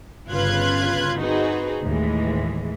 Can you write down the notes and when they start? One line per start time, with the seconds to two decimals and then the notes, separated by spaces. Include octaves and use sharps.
0.29 G1 C#3 F4 B4 F#6 G#6
1.21 C4 D#4 F#4 G#4 B4
1.85 D#2 A2 E3 G#3